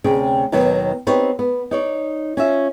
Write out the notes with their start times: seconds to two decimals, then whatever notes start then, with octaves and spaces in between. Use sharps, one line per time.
0.04 D2 C3 C#4 G#4 G5
0.52 D#2 B2 D#3 F#3 B3
1.07 B3 C4 D#4 G4 C#5
1.39 B3
1.71 D#4 C#5 D5
2.37 C#4 F4 E5